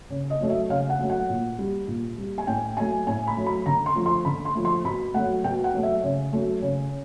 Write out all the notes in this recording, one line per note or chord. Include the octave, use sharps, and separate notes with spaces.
C#3
D#5
F#3 A3
E5
C#3 F5
F#5
F#3 A3
F#5
A#2
G3
A#2
G3
G#5
A2 G5
F#3 A3 G#5
A2 G#5
B5
F#3 A3
B5
D3 A#5
C6
F3 A3
C6
D3 B5
C6
F3 A3
C6
B2 B5
F#3 A3 F#5
B2 G5
F#5
F#3 A3
E5
C#3
F#3 A3
C#3